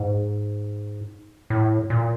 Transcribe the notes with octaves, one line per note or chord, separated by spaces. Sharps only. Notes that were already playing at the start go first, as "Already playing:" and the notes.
Already playing: G#2
A2
A#2